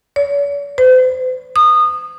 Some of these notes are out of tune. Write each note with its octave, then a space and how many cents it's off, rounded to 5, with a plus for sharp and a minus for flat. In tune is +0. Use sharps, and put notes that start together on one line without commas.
C#5 +45
C5 -40
D#6 -20